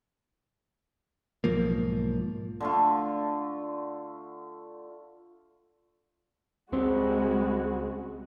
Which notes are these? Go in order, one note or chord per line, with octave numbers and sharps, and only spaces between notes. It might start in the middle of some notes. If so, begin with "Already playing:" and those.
B1 G#2 F3 A#3
D3 A3 F4
C#2 G3 G#3 C4 F#4